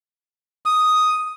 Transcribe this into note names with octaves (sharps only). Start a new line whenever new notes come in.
D#6